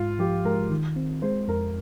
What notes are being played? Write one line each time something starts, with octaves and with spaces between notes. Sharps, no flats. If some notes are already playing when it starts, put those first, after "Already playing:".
Already playing: G#2 G#3 F4
F3 G4
G#3 A#4
D#3
C4
G#3 C5
F2 A#4